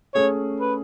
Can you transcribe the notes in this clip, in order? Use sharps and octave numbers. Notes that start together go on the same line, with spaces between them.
A3 C#4 G#4 C#5
B4